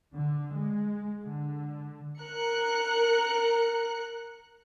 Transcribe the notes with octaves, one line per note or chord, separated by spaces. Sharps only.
D3
G#3
D3
A#4 F#6 C#7